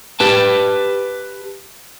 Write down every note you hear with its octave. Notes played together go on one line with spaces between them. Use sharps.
G4 B4 A5